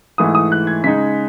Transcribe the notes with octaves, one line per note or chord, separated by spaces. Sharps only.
G#2 E3 A3 E4 D#6
D#6
F#6
G#6
C#3 G#3 D#4 B6